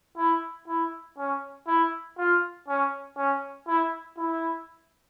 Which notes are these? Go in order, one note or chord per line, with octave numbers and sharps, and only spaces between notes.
E4
E4
C#4
E4
F4
C#4
C#4
E4
E4